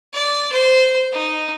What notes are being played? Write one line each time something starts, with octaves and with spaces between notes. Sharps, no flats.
D5
C5
D#4